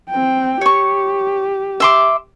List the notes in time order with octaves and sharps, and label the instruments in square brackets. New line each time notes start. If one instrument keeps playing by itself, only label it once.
[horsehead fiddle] C4 G5
[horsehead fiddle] G4 [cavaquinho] C#5 C#6
[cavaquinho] E5 C6 D6